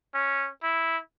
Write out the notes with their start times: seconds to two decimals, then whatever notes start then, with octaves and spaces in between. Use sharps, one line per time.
0.14 C#4
0.63 E4